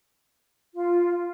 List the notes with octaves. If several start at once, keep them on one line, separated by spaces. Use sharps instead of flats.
F4